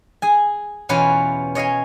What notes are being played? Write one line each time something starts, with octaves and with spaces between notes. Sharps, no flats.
G#4 G#5
E2 B2 C#4 F4 B4 G#5
C#5 D#5 F5 G#5